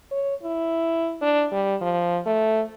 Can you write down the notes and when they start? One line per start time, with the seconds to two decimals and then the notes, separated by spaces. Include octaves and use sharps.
0.11 C#5
0.43 E4
1.21 D4
1.52 G3
1.81 F3
2.26 A3